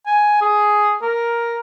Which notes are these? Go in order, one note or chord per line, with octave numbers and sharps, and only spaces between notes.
G#5
G#4
A#4